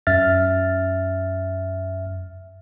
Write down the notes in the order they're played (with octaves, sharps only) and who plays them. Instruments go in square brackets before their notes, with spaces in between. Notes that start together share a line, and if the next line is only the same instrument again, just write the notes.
[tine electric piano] F#2 E5 F6 A6